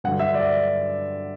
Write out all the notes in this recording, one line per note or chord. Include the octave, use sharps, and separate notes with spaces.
G2 D3 F#3 F#5
E5
D5